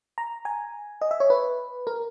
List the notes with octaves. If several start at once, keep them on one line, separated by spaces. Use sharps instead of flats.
A#5
G#5
D#5
E5
C#5
B4
A#4